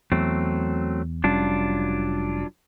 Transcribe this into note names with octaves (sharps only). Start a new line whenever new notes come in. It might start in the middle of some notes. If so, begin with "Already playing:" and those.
E2 F#3 A3 C4
F1 F#3 G3 C#4 D4 F4